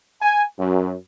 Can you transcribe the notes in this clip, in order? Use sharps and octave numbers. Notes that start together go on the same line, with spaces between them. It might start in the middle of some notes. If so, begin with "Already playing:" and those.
G#5
F#2